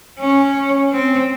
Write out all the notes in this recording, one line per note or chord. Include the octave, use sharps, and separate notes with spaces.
C#4
C4